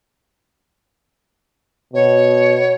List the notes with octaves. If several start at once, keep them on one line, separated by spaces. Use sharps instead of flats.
B2 C#5